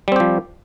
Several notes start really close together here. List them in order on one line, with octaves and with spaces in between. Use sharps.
G3 C4 G4 F3